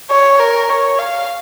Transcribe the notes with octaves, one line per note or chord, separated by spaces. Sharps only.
C#5
A#4
C#5
F5